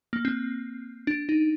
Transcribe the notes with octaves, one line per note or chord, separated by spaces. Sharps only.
A#3
C4
D4
D#4